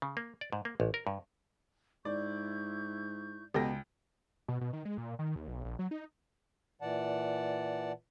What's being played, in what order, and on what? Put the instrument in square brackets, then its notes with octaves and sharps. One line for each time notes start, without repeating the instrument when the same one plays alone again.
[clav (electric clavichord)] C#3
A#3
D5
G#2
A#3
A1
A#4
G2
[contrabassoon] G#2 [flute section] E4 C#6 G6 [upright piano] D5
[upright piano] C#2 G5 A#6 [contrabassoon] B2 [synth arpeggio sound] G4 A4
[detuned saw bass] B2
B2
D#3
G#3
A#2
D#3
D#2
B1
A#1
F#3
D#4
[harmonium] A#2 E3 D5 F#5 A5